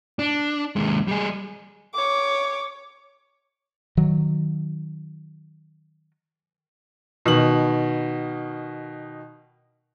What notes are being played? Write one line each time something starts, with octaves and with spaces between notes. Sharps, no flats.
D4
D#2 G#3
G3 G#4
C#5 D6
D#3 F#3
B2 D#3 F#7